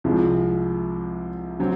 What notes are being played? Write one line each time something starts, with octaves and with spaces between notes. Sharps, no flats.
C2 C3 F3 G#3
C3 F#3 C4